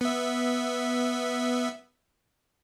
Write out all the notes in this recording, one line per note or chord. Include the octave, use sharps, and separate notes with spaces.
B3 E5